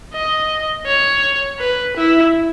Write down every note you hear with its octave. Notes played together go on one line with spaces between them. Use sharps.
D#5
C#5
B4
E4